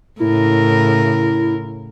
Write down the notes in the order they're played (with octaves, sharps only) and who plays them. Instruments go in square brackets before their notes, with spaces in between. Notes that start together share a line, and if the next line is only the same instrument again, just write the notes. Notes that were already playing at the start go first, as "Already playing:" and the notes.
[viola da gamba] A2 C#3 A#4 [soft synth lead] E4